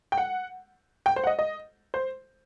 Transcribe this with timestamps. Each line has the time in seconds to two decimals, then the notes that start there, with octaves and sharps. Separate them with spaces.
0.12 G5
0.17 F#5
1.06 G5
1.16 C5
1.24 F#5
1.27 D#5
1.39 D#5
1.94 C5